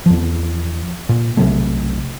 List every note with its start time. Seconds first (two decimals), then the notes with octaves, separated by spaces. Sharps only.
0.06 E2 F3
1.09 A#2
1.37 B1 C3 F#3 A3